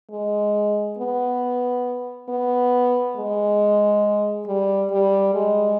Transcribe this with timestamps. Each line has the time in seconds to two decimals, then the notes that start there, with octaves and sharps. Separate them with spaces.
0.11 G#3
0.98 B3
2.29 B3
3.16 G#3
4.46 G3
4.90 G3
5.34 G#3